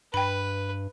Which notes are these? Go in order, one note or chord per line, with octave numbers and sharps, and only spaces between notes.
G2 B4 G5 B5